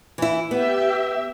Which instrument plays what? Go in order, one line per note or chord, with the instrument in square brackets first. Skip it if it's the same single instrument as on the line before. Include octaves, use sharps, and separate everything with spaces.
[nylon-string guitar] E3 E4
[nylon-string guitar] B3 [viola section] G4 E5